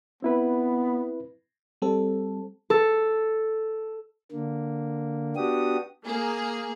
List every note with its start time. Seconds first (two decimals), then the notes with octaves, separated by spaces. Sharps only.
0.22 B3 C4 E4 B4
1.82 G3 C4 A4
2.70 A4
4.32 D3 A#3
5.36 B3 D4 F#4 G4 D#6
6.05 A#3 G#4